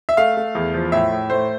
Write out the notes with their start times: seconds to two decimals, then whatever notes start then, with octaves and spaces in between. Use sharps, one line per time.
0.09 E5
0.17 A3 F5
0.37 A3
0.55 E2
0.74 F3
0.92 A2 E5
1.12 A2
1.30 A3 C5